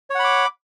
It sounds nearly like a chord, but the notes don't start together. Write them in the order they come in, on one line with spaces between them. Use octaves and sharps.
C#5 F#5 B5 D6